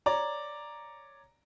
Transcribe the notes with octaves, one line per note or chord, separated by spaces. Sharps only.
C#5 D5 A#5